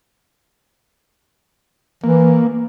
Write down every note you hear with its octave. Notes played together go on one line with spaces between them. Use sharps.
E3 A#3